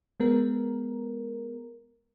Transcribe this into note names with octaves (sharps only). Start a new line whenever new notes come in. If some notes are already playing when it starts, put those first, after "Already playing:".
G#3 B3 A#4